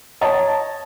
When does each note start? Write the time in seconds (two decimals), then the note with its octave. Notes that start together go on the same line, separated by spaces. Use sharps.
0.21 C#5 D#5 A5 A#5